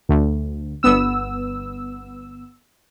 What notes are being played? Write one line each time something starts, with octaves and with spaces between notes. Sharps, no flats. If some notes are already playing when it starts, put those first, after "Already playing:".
D2
G1 B3 E6